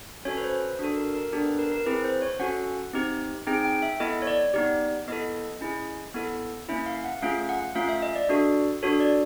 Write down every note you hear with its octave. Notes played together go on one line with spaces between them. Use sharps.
C#4 F#4 A4 C#5
B4
C5
D4 F#4 A4
A#4
A#4
B3 D4 G4 A4
B4
A#4
A#4
C4 E4 G#4 B4
C5
C#5
C#4 F#4 A4 F#5
C4 D#4 G4
C4 D#4 G#4 G5
G5
E5
B3 E4 A4 D#5
C#5
D5
B3 D#4 G4 D5
B3 E4 A4 D#5
C#4 E4 G#4
B3 E4 A4
A#3 C#4 E4 E5
F5
F#5
A3 C#4 F4 G#4 F5
F#5
A3 C#4 F4 F5
E5
D#5
D5
D4 F#4 A4
D4 F#4 A4 C#5
D5